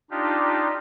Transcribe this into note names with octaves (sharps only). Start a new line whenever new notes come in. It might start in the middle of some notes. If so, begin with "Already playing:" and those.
D4 D#4 F4 G4